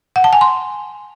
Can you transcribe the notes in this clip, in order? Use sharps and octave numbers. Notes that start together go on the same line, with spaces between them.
F#5
A5
G#5
C6